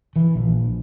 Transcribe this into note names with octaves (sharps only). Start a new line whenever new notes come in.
E3
A#1